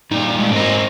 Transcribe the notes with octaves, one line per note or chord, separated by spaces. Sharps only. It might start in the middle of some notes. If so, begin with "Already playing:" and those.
G2 A#2 D#4
G#3 A#4
G#2 C4 D#4 A#4